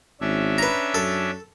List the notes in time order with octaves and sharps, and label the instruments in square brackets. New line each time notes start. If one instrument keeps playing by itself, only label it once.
[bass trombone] G#1 [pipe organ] C#4 D4 E5
[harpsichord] B4 A#5
[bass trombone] F#2 [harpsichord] A4